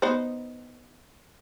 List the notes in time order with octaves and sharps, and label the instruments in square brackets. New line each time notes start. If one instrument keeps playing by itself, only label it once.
[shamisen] B3 D#4 C5